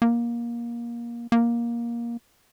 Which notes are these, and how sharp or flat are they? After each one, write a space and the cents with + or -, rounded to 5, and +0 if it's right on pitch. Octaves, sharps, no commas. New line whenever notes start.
A#3 +20
A#3 +15